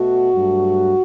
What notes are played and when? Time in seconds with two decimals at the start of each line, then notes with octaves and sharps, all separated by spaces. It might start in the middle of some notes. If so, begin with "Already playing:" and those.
Already playing: B2 A3 F#4
0.33 G2 F#3 A3